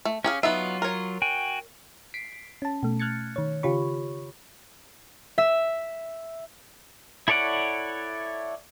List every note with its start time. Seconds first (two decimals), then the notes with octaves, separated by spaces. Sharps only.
0.05 A3
0.24 C#4 G4 G#4 F5
0.43 F#3 B3 D#4 F4 E5
0.82 A#4 C#5
1.22 F#4 G5 G#5
2.14 B6 C7 D7
2.62 C#4 A5
2.83 B2 A3
2.99 F6 F#6 G#6 A6 C#7
3.36 D#3 C#5
3.63 C#3 F4 G4 C#5 B5 C#6
5.38 E5
7.28 E4 A4 C#5 D5 F#5